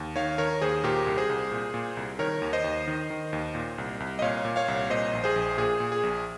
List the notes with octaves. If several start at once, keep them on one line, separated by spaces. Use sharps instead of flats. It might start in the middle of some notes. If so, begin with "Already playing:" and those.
Already playing: D#2
D#3 C#5 F5
D#3 A#4 C#5
D#2 G#4 C5
A#2 G4 A#4
C2
G#4 C5
C2
A#2
A#2
C2
D#3 A#4 C#5
D#2
C5 D#5
D#2
D#3
D#3
D#2
A#2
C2
C2
D#5
A#2 C#5 F5
A#2
C#5 F5
C2
A#2 C5 D#5
A#1
G#4 C5
A#1
A#2 G#4
A#2
G#4
A#1